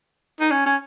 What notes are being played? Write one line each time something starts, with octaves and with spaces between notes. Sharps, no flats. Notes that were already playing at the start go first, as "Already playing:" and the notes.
D#4
C#4
C#4